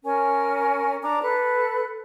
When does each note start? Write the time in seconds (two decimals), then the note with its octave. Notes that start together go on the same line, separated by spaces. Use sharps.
0.04 C#4 A#4 G#5
1.02 D4 A#5 D6
1.23 A4 B4 F#6